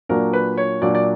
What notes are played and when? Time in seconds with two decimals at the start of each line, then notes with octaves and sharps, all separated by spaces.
0.09 A#2 F#3 A#3 D4 A#4
0.33 B4
0.58 C#5
0.82 A#2 F#3 A#3 D4 D5
0.95 D5